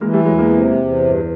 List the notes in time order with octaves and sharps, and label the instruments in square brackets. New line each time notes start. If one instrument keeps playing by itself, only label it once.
[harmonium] E3 [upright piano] G#3 A#3
[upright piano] G3 A3
[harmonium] E2 [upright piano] F#3 G#3
[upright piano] G#3 A#3
[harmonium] C3
E2
G2